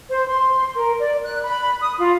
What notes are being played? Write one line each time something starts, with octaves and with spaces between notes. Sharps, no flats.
C5
C6
A#4
D5
F#6
B5
D#6
F4